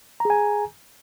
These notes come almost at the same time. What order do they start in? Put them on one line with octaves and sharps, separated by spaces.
A#5 G#4 G#5